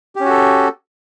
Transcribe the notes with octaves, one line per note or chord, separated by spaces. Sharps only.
C#4 F#4 G4 A4